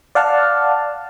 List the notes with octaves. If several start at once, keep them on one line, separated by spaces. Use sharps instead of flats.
D5 F5 F#5 A5 F6